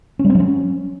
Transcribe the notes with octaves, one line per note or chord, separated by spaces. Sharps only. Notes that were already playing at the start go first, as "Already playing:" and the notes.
C#4
G3
C4
F#3
C#4